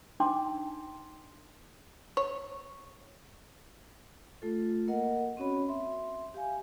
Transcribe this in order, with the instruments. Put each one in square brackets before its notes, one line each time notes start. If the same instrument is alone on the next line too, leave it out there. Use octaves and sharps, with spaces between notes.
[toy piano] D4 D#4 G5 A5 C6 D6
[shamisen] C#5
[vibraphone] A3 F4 A4
A#3 A#4 D#5 F#5
C4 C#4 F#4 C#5 B5
E5 C6
G4 F5 G#5